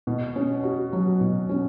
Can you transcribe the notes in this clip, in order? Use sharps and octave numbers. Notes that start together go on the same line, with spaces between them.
B2
C#4
F#4
F#3
B2
C#4